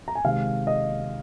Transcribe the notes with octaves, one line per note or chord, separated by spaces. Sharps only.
A#5
G#5
C3 D#3 G#3 F5
D#5